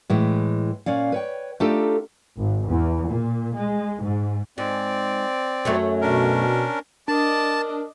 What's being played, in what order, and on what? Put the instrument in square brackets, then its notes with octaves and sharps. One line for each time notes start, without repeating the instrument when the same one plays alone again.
[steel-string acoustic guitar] A2 E3 G#3
A#2 C#4 D5 F5
B4 C#5 G5
A3 D4 D#4 F4 G4 A4
[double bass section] G#1
E2
A#2
G#3
G#2
[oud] G#2 [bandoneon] C4 D5
[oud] F#2 F#3 A3
[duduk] B2 [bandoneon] C#4 D4 A#4
[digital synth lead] D4 [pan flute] A#4 [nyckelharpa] D5 D#5 [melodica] A5